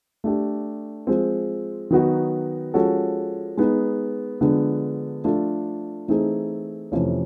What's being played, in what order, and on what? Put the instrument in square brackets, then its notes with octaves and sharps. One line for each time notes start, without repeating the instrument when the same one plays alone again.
[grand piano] A3 D4 G4
F3 G#3 C4
D#3 F#3 B3 D#4 F#4
F3 G#3 C#4 F#4 A4
G#3 B3 D#4
D3 F3 G#3 B3 D4
F3 A3 D4 F4 A4
E3 A3 C4 D#4 G#4
F2 C3 E3 A3 C#4